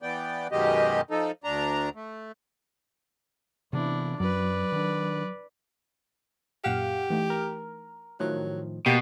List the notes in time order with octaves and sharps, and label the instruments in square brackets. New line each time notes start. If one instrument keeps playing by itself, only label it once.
[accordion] E3 B3 D5 G5
F#2 B2 D#3 G#3 G4 D#5
F3 D#4 A4
D2 D4 A#5
A3
[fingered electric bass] C3 E3 B3 [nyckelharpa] D4 E4
[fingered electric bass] F#2 [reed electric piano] F#3 [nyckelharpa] B4 D5
[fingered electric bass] D#3 D4
[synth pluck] F#2 A#2 E7 [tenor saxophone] G4 [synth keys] F5 F#5
[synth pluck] E3 A3 D#4
[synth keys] A#4
[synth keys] A2 D#3 F3 [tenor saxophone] F#3 [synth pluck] F#6
[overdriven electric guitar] B2 [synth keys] A#3 A5 [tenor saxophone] G4